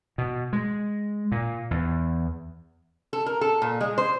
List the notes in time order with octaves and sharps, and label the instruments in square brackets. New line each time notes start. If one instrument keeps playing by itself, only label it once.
[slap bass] B2
G#3
A#2
E2
[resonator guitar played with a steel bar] A4
A#4
A4
A#2
G#3
C5